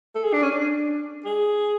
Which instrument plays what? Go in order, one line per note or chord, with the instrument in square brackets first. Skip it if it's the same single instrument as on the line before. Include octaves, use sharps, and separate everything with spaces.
[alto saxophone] A4
G#4
D4
C#4
D4
G#4